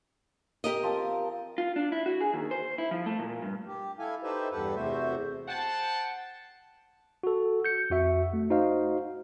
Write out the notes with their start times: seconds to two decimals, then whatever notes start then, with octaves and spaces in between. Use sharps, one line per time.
0.64 G4 A#4 D#5
0.83 F3 C4 A5
1.58 F4
1.76 D4
1.92 E4
2.06 F#4
2.21 G#4
2.34 D#2
2.51 C5
2.78 E4
2.91 F3
3.06 A3
3.20 A#2
3.42 G2
3.67 G4
3.99 E4 A4 F5 G#5
4.23 D#4 G4 A4 B4 C5 E5
4.52 E2 G2 G4 A4 B4 F#5
4.75 E2 C3 A3 F#4 C5 E5
5.48 C5 F#5 G5 A5
7.23 F#4 A4
7.65 G6 C#7
7.90 F2 F#4 E5
8.33 A3
8.50 D#4 F#4 C5 D#5 F5